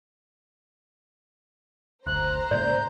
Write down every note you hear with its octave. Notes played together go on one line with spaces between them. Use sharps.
F#1 D2 C5 A#5 F#6
G#2 C#3 A#3 D5 G6